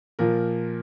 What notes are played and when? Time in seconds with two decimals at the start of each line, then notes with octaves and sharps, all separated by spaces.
0.19 A#2 F3 A#4